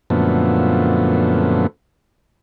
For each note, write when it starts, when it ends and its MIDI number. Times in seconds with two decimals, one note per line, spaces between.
0.10 1.67 42
0.10 1.67 46
0.10 1.67 50
0.10 1.67 53
0.10 1.67 57
0.10 1.67 59